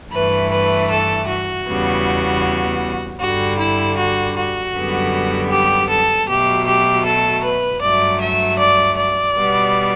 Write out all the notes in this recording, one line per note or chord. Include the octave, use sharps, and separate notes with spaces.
G2 E3 A3 B4
B4
A4
F#4
E2 C#3 G3 B3
G2 D3 G3 F#4
E4
F#4
F#4
F#2 D3 G3 B3
G4
A4
B2 F#3 A3 G4
G4
A4
B4
G2 F#3 A3 D5
E5
D5
D5
B2 G3 B3